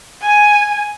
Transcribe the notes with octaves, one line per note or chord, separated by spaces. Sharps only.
G#5